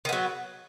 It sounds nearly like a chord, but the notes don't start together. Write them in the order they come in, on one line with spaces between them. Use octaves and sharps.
D#3 B3 F#3